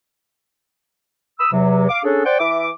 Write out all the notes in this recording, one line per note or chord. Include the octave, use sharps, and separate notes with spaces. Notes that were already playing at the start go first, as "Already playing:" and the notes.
B5 D#6 E6
E2 C3 F#3
F5 D6
C#4 D4 G#4 A4
C5 D5 F#5 G5
E3 E5 D6